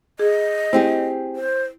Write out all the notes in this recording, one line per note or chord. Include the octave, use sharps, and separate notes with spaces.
G#4 D#5
C4 E4 G4 G#4
C5